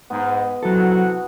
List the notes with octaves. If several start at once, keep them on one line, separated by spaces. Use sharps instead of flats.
G#2 B3
C3 F#3 E4 F#4 A4